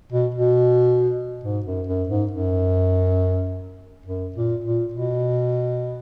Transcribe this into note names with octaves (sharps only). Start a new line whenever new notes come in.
B2
B2
G#2
F#2
F#2
G#2
F#2
F#2
A#2
A#2
B2